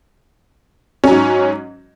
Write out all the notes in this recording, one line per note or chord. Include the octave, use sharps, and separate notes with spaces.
G#2 F#3 C#4